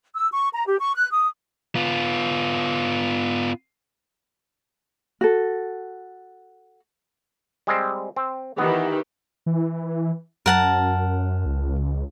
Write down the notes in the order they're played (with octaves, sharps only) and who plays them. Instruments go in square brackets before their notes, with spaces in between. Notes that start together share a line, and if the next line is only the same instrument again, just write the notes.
[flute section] E6
C#6
A#5
G4
C#6
F#6
D#6
[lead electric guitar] B3 F4
[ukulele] F#4 A4
[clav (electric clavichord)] G3 G#3 C4
C4
[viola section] D#3 E3 G4 [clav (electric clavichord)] B3
[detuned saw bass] E3
[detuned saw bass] F#2 [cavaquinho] A#4 F#5 A5
[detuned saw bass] C#2